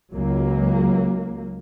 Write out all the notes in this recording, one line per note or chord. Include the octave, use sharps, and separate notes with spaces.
C#2 F#3 A#3